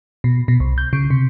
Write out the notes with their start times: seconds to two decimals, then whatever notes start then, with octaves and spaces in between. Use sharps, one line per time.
0.24 B2
0.48 B2
0.60 C2
0.78 G6
0.93 C#3
1.10 C3